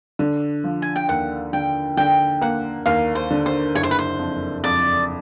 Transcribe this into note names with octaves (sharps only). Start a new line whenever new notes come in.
D3
F3
G#5
G5
D#2 F#5
D3 G5
D3 G5
A#3 F#5
D#2 F5
C5
D3
C5
F#1 C#5
C5
B4
C5
F2
F2 D5